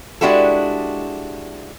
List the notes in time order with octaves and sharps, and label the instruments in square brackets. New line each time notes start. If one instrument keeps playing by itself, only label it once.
[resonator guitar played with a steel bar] G#3 D4 E4 F#4 G4 A4